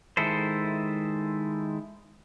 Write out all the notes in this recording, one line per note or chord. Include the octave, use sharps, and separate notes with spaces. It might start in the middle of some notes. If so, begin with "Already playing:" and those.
D#3 G#3 E4 A4 C5